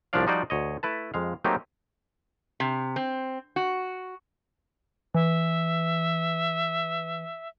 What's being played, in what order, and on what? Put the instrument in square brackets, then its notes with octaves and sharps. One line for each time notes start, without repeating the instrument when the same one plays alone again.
[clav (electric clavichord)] C2 F3 C#4 D4 D5 F5
F3 G3 D#4 F#4 C5 D5
D2 C#5 D#5
A3 E4 B4 A5
F2 G#3 F5
F#3 A3 A#3 C4 D#4 G4
[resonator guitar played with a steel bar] C3
C4
F#4
[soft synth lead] E3 [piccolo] E5